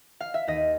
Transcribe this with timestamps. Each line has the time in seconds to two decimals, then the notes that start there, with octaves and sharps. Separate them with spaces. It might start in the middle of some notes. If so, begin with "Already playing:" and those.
0.20 F5
0.34 E5
0.47 D#2 D#5